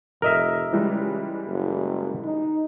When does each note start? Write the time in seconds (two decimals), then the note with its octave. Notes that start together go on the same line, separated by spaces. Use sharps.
0.22 F1 A#4 D#5 E5
0.72 C#2 E3 G3 G#3
1.46 F#1
2.24 D#4